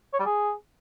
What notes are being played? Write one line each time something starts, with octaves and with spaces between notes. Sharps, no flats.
C#5
G3
G#4